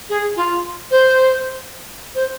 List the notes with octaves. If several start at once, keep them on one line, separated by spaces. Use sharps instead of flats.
G#4
F4
C5
C5